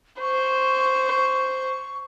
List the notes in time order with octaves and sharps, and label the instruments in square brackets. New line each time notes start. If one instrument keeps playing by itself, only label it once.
[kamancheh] C5 [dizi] C#6